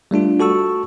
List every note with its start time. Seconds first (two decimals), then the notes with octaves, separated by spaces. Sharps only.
0.11 G3 A3 D4 F4
0.40 F#4 A4 A5 C#6 E6